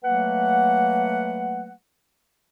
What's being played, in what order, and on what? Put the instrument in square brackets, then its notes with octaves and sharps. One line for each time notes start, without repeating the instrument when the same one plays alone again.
[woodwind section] F#3 A3 A#3 B4 F#5